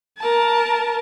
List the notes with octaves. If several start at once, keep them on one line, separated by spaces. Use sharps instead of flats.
A#4 A5